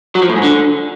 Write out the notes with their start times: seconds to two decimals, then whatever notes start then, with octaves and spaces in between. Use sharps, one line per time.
0.15 F#3
0.22 F3
0.29 A2
0.36 G#2
0.43 D3